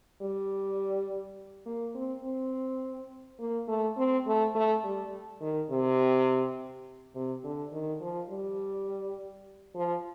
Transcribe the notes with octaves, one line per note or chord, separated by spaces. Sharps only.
G3
A#3
C4
C4
A#3
A3
C4
A3
A3
G3
D#3
C3
C3
D3
D#3
F3
G3
F3